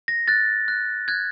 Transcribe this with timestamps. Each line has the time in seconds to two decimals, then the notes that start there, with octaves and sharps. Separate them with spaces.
0.08 A#6
0.28 F#6 A6
0.68 F#6
1.08 F#6 G#6